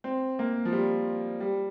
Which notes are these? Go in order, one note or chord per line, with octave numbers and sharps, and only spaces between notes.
C4
A#3
F3
G3
G3